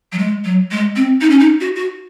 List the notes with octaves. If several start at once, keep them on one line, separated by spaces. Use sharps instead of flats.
F#3
G#3
F#3
G#3
C4
D#4
C#4
D#4
F#4
F#4